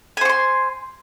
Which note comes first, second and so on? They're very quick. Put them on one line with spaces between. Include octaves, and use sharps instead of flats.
G#5 C5 C#6 C6